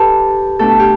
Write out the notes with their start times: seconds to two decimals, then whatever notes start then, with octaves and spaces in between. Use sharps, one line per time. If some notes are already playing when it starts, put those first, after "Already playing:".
Already playing: G4 A4 B4
0.59 B2 A3 D4 A4
0.79 G4